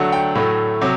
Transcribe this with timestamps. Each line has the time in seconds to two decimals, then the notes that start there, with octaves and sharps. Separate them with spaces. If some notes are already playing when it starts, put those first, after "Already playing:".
Already playing: D3 F#3 A3 F#5
0.12 G5
0.35 A2 F#3 A3
0.81 C3 F#3